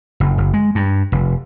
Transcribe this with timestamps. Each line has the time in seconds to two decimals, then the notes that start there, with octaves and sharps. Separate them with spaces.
0.20 F#1
0.38 F#1
0.54 G#3
0.75 G2
1.12 F1